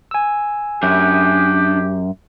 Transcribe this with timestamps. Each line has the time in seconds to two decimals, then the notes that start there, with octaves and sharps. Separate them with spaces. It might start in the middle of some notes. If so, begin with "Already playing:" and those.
0.11 G#5 E6
0.83 F#2 D4 G4 E5